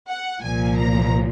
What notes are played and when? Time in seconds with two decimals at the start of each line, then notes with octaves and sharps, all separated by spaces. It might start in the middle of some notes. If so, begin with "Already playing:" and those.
0.08 F#5
0.43 C2 A#2 F3 G#5
0.78 A#5